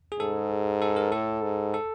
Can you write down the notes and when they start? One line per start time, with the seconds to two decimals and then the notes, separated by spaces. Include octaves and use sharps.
0.12 G#4
0.19 G#2 A4
0.82 A4
0.96 A#4
1.12 A2 A4
1.43 G#2
1.74 A4